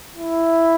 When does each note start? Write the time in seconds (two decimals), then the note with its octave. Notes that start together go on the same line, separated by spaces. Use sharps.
0.16 E4